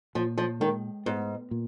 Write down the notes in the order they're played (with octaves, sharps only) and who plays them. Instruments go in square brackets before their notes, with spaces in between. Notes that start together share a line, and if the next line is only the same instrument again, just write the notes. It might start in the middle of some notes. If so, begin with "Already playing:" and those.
[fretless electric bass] A#2 [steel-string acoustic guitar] F3
[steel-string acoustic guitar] F3
[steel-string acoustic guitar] D#3 [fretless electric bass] G#3
[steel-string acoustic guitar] G#2 [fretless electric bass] B3
[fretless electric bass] A#2